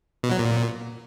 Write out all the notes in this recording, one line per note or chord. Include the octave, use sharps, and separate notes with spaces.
B2
F#3
A#2